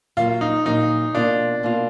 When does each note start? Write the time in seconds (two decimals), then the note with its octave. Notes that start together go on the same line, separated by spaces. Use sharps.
0.17 A#2 F#3 A#3 F4
0.41 D#4
0.66 A#2 F#3 A#3 D#4
1.14 B2 A#3 D4 F4
1.63 B2 A#3 F4